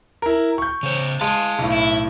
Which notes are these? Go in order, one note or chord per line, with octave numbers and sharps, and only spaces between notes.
E4 A#4
C#6 G6
C#3 C5
G#3 F5 A5
B1 A2
E4